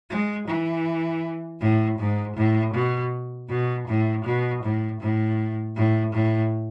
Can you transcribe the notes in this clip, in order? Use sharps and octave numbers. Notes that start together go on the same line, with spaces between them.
G#3
E3
A2
G#2
A2
B2
B2
A2
B2
A2
A2
A2
A2